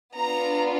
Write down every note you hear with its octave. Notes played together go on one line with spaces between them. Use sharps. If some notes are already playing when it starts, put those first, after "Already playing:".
B3 D4 F4 A#5